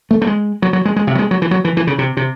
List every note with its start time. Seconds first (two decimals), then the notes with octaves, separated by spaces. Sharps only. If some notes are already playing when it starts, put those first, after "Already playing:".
0.11 A3
0.22 A3
0.27 G#3
0.62 F#3
0.73 F#3
0.85 G#3
0.96 G#3
1.07 C3
1.15 F#3
1.19 G#3
1.31 F#3
1.42 E3
1.51 F#3
1.65 E3
1.77 E3
1.87 C#3
1.98 C3
2.17 C3